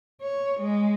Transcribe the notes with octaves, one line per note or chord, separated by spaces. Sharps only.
C#5
G#3